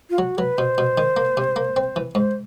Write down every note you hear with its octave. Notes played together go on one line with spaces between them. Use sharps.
F4
F#3 F#4
F#3 B4
B2 C5
B2
D#3
A#3
C3
A#3
C4
E3
G#2 C5